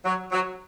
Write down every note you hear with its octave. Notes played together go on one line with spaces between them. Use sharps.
F#3
F#3